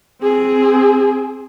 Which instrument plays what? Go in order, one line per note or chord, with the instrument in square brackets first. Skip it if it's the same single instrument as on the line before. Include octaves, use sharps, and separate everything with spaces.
[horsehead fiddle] C4 G#4